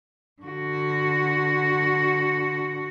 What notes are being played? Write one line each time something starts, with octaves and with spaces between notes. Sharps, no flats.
D3 F#4